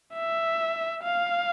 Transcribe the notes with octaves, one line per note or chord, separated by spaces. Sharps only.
E5
F5